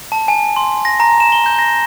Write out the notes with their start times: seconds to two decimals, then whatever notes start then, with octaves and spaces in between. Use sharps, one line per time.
0.12 A5
0.28 G#5
0.56 C6
0.85 A#6
1.00 A#5
1.20 E7
1.32 G7
1.46 G6
1.59 A#6